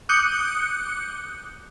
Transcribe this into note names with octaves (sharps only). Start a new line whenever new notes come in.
D6 D#6 F#6 G6 C#7